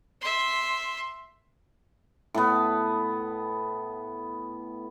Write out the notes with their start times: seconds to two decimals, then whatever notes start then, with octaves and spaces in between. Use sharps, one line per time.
0.21 E5 C6
2.34 A2 B3